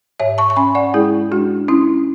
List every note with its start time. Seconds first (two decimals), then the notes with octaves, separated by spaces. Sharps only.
0.20 G#2 C#5 E5
0.38 A5 C#6
0.50 C#6
0.56 C#4 G#5 B5
0.75 D5 F#5
0.94 G#3 E4 G#4
1.32 G#3 D4 F#4
1.68 C#4 E4